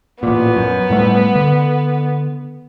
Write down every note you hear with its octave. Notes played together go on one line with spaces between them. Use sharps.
A1 A#2 B3
F#2
A2 G3 A3
D3